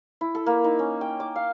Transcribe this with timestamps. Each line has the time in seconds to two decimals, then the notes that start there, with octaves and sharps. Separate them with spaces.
0.21 E4
0.35 A4
0.46 A#3
0.64 D#4
0.79 C#4
1.01 G5
1.20 D6
1.36 F5